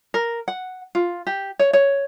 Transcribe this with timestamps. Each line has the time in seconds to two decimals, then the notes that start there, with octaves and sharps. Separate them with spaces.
0.14 A#4
0.48 F#5
0.95 F4
1.27 G4
1.59 C#5
1.73 C#5